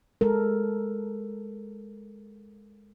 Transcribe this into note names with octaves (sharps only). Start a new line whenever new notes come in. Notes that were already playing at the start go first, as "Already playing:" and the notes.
G#3 A4 A#4